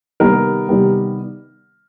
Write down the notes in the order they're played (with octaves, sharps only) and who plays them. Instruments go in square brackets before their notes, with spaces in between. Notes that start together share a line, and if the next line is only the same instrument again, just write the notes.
[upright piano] C3 D#3 G3 B3 A#4
C3 D#3 G3 B3